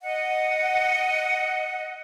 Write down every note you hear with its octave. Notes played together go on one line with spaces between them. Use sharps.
D#5 F#5